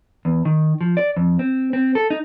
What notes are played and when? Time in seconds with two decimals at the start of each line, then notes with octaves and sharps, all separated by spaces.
0.25 E2
0.45 D#3
0.81 F3
0.97 D5
1.17 F2
1.39 C4
1.73 C4
1.95 A4
2.10 D#4